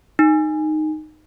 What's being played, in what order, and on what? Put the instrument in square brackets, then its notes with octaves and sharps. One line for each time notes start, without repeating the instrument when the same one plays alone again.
[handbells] D#4